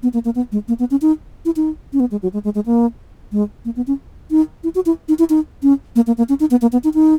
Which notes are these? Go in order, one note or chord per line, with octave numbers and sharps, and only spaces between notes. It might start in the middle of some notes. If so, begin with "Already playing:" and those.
B3
A#3
A#3
B3
G#3
A#3
B3
C#4
D#4
E4
D#4
C#4
B3
G#3
F#3
G#3
G#3
G#3
A#3
G#3
A#3
B3
C#4
D#4
E4
F#4
E4
D#4
E4
D#4
C#4
A#3
A#3
A#3
C#4
D#4
B3
A#3
B3
D#4
D#4